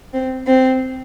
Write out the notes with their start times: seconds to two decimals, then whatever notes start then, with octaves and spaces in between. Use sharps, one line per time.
0.13 C4
0.46 C4